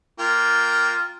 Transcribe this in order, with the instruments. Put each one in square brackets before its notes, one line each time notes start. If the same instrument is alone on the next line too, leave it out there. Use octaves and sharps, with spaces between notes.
[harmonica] A#3 G5 [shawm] F4